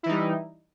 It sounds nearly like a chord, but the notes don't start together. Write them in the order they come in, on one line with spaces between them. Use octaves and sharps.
E4 E3 D#4 G3